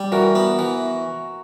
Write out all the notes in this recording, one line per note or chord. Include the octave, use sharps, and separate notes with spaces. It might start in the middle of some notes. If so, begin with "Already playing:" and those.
Already playing: G3
E3 F#4 A#4
B3
E3